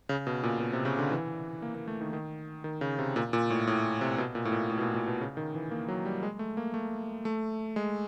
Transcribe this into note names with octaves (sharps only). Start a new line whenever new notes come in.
C#3
B2
A#2
B2
C3
C#3
D3
E3
A#3
A#3
A3
D#3
D#3
D#3
C#3
C3
A#2
A#2
A2
A2
C3
B2
A#2
A2
A#2
A2
B2
A#2
A#2
B2
C#3
D#3
E3
A#3
F#3
G3
G#3
A3
A#3
A3
A3
G#3